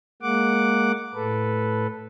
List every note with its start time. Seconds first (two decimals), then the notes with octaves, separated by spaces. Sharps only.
0.22 G#3 A#3 F#5 D6
1.15 A2 A4 B4